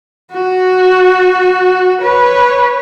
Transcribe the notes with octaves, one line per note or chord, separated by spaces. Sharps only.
F#4
B4 C#5